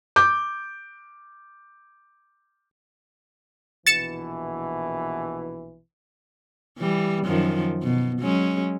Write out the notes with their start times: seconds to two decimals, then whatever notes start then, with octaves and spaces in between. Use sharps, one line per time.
0.16 D6 G6
3.87 A#1 B2 E3 A6 C#7 E7
6.78 E3 G3
7.25 F#2 D#3 F3
7.83 B2
8.20 F#3 G#3 C#4